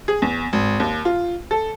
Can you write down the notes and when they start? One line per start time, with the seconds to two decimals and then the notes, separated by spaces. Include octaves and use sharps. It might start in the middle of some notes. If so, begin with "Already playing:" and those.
0.08 G#4
0.22 E2
0.53 G#1
0.80 D#2
1.05 F4
1.51 A4